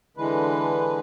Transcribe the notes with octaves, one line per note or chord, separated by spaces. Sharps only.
D3 E3 G#3 B4